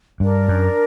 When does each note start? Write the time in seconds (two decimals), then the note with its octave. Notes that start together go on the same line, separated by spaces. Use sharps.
0.20 G2 D4 A#4 D5
0.48 F#2